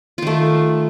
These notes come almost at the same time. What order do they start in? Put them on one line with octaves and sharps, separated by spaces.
F4 D#3 A3